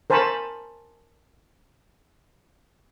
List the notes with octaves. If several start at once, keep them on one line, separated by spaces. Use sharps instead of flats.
A#4 C5 G#5 A5 B5 C#6